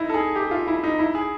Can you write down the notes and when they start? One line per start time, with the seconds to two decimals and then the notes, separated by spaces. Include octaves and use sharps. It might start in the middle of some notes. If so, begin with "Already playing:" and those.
Already playing: D#4 E4
0.10 A4
0.14 G#4
0.36 G4
0.51 F4
0.68 E4
0.84 D#4
0.99 E4
1.15 G#4